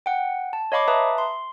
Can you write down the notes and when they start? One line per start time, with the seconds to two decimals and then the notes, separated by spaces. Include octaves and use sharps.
0.06 F#5 G5
0.53 A5
0.72 C#5 D#5 F5 B5 C#6 D6
0.88 B4 E5 A5 A#5 D#6
1.18 C6